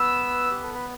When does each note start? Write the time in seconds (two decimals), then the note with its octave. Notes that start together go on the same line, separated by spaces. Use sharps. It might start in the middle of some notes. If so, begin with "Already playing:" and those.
Already playing: B3 B4 E6
0.51 G4
0.63 A4
0.74 B4